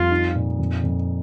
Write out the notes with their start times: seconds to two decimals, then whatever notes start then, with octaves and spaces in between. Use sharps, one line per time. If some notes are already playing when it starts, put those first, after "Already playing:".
Already playing: F2 G3 F4
0.11 D#4
0.35 A#2
0.59 F2
0.84 F2